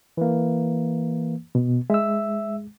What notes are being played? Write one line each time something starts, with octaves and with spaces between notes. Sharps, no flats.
E3 A#3
B2 B3
G#3 E5 E6